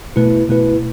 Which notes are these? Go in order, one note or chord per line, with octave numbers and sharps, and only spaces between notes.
B2 A3 E4 B4
B2 A3 E4 B4